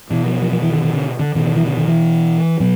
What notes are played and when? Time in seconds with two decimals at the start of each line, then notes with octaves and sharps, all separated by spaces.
0.10 B2 E3
0.26 F3
0.42 F3
0.52 F3
0.62 E3
0.73 D#3
0.83 D#3
0.93 D3
1.19 D3
1.35 B2 D#3
1.46 D#3
1.56 E3
1.67 D3
1.77 D#3
1.88 E3
2.60 B2 F#3